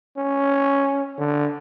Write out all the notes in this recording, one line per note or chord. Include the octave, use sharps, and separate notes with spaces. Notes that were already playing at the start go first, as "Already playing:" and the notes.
C#4
D3